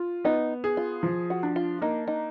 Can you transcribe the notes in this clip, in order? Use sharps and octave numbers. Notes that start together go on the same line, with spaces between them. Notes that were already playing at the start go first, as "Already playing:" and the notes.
Already playing: F4
B3 D#4
G#4
F4
F3
F#4
D4
F4
A#3 D#4
D#4